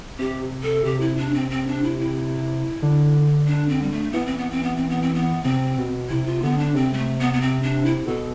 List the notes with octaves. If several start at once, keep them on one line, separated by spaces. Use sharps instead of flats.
C3 G4
A4
C3 G4
E4
D4
C4
C4
D4
E4
E4
D3
D4
C4
G3
A3
E3 B3
C4
B3
C4
B3
C4
B3
C4
B3
C3 C4
B2
C3 E4
F4
D3 B3
D4
C3 C4
G3
A3
B3
B3
C4
D4
E4
B2 A4